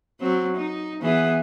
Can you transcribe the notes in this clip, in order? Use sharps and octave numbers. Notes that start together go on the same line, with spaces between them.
F#3 C4
D#4
E3 B3 G#4